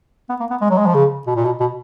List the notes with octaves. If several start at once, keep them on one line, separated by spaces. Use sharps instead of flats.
B3
A#3
B3
G#3
F#3
G#3
F3
C#3
B2
A#2
B2
B2